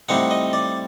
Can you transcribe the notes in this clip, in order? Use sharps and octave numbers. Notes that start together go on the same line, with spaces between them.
A2 G3 C4 D#4 F#5
D#5
D5